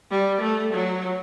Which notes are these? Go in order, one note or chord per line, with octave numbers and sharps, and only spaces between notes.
G3
A3
F#3